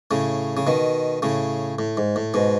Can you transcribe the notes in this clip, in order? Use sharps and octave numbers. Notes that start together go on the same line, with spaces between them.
A2 C#3
C#3
B2 D#3
A2 C#3
A2
G#2
A2
G#2 B2